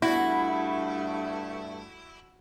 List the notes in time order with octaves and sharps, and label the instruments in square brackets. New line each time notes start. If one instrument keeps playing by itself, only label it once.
[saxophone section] G2 A3 [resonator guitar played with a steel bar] E4 [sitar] F#4